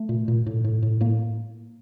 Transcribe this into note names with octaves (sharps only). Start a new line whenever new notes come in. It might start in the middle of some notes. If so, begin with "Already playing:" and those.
Already playing: A3
A#2
A#2
A2
A2
A2
A2 A#3